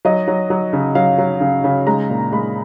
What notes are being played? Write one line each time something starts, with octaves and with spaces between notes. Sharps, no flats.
F#3 D#5
F#3
F#3
C#3
F#3 F5
F#3
C#3
C#3
G#3 A#5
A#2
G#3 B5